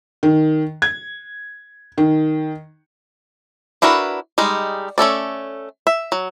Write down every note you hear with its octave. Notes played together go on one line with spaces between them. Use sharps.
D#3
G#6
D#3
D4 E4 F#4 A#4 B4
G3 G#3 D#4
A3 C#4 A4 D5
E5
F#3